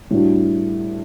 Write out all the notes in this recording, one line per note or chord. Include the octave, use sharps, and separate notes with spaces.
A2 G3 D4 F#4